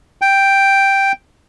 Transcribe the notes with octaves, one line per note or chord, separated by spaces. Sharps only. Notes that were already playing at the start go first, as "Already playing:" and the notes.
G5